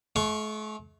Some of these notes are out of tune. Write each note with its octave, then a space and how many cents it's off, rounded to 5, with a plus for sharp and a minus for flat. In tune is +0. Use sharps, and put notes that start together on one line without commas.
A3 -45 F5 +0 C#6 +0